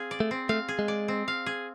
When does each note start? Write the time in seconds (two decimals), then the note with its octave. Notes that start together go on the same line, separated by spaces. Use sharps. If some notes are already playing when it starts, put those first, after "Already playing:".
Already playing: C4 G#4 F5
0.11 D5
0.20 A3
0.31 C4
0.49 A3 F5
0.69 G#4
0.79 G#3
0.88 D5
1.08 C4
1.28 F5
1.46 G#4